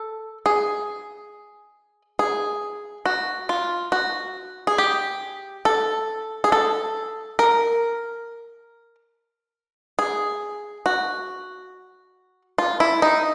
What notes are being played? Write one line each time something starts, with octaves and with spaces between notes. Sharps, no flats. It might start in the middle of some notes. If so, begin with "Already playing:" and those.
Already playing: A4
G#4
G#4
F#4
F4
F#4
G#4
G4
A4
G#4
A4
A#4
G#4
F#4
F4
E4
D#4